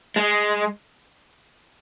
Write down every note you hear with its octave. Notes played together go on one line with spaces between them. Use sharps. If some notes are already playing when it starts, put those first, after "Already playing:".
G#3